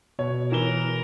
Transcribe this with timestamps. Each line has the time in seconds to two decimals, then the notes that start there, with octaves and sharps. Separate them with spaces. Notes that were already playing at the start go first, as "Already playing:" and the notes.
0.19 B2 C#5
0.52 E3 A#4 E7 G7